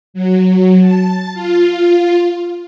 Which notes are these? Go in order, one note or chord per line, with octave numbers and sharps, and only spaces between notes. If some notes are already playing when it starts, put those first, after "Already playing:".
F#3
A5
F4